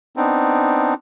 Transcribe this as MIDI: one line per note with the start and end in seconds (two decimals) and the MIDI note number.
0.16 0.94 59
0.16 0.94 60
0.16 0.94 62
0.16 0.94 63